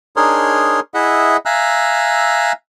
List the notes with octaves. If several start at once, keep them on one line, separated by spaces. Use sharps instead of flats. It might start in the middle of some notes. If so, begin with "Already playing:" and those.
D4 D#4 G#4 A#4 C#5 C6
E4 G#4 D#5 E5 F#5
E5 F5 G#5 A#5 E6 F#6